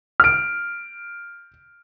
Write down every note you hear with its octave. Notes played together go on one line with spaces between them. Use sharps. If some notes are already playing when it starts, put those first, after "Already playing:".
F6 D7